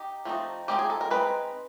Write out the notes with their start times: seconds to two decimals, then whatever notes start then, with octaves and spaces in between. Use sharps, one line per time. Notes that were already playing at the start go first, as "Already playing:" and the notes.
Already playing: D#4 G4
0.25 F3 A3 C4 D#4
0.68 G#3 C4 D#4 G4
0.79 G#4
0.90 A4
1.01 A#4
1.11 G#3 C4 D#4 B4